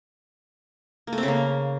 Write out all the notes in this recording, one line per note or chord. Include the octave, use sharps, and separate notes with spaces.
A#3
A3
C4
C#3
A#3